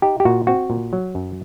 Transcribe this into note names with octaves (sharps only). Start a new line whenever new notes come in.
D#4 G4
G4
A#2 F#4
C4 F#4
A#2
F#3
F#2